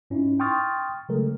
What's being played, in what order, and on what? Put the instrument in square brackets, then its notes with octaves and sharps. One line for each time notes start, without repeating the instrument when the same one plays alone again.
[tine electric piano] G#2 C#4 D#4 E4
G5 C6 C#6 D#6 F6 A6
C#3 F#3 G#3 A3 A4 A#4